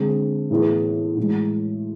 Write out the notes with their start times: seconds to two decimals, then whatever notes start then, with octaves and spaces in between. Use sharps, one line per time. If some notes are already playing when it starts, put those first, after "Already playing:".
Already playing: D3 G#3 C4 G#4
0.50 A2 E3 B3 E4 G#4
1.17 A2 E3 G#3